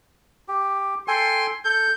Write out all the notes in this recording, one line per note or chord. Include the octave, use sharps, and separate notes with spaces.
G4
A4 G5 G#5 C6
A4 G6